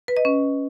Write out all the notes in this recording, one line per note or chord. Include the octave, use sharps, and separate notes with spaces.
B4
D#5
C#4